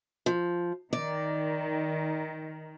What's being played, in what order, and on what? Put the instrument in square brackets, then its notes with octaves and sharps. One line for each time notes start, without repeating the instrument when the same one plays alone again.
[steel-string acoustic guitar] F3
[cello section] D#3 [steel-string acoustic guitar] D5